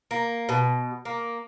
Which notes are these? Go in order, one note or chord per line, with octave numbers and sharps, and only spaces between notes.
A#3
B2
A#3